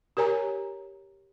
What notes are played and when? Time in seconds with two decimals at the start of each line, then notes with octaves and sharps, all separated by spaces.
0.17 G4 A#4 C#5 G#5 A#5